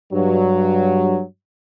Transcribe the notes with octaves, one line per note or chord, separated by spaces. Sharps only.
G2 F#3